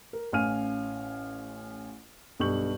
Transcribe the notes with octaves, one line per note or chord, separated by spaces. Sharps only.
A#4
A1 C#4 F5 G#5 F6 D#7
B1 G2 C#6 G6 F#7